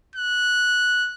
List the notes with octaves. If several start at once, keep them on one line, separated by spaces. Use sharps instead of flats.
F#6